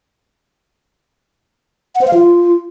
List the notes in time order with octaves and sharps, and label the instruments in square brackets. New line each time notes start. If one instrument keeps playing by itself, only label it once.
[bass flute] F#5
C5
F5
F4